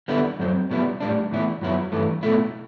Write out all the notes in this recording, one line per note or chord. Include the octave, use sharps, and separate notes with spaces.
D3 G3 B3 E4
F#2 F#3 C4
B2 G3 B3 E4
A2 G3 D4
A2 E3 B3 E4
F#2 F#3 B3 E4
G2 E3 A3
B2 A3 E4